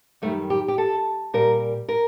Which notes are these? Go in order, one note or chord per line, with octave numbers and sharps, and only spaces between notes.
F#2 D#3 G3 A3
G4
G4
A4
A#2 G3 A#4
A#4